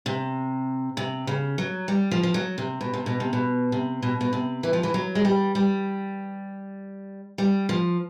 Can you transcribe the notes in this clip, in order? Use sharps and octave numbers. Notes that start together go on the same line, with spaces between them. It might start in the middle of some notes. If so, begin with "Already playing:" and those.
C3
C3
C#3
F#3
G3
F3
F3
F#3
C3
B2
C3
B2
C3
B2
C3
B2
B2
C3
E3
F3
E3
F#3
G#3
G3
G3
G3
F3